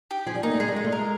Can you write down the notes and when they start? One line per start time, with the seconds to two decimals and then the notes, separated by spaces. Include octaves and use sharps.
0.11 G4
0.26 F3 G#4
0.35 G3
0.43 A#3 D#4
0.51 A3
0.60 G#3 G#4
0.68 G3
0.76 G#3 F4
0.84 A3
0.92 G#3 A#4